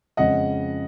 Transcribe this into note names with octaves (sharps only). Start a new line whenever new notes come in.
F2 C#3 G#3 C#4 D#5 F#5